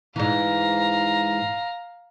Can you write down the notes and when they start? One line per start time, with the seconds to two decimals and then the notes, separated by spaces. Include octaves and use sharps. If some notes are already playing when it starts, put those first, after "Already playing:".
0.16 G#2 E3 F5 A#5